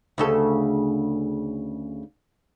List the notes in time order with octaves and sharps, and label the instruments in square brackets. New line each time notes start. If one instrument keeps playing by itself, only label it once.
[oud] D2 C#3 A4